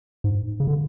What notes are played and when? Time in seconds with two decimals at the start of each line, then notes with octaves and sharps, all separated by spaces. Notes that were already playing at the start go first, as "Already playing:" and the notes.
0.24 G#2
0.60 C#3
0.67 D3